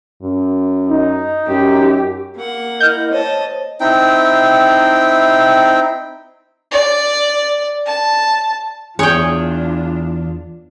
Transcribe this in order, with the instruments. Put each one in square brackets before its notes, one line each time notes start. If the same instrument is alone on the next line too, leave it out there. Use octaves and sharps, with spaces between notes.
[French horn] F#2
[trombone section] D#4
[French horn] F#2 [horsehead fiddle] G4
[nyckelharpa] A#3 F#5
[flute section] E4 A#4 D#5 [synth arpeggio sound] F6 G6
[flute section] C5 C#5 [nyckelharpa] D#5 A5
[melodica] C4 D#4 E4 G5
[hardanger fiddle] D5
A5
[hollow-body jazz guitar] E2 [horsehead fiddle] D4 F4 [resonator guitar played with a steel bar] G#4 [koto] C#5 G5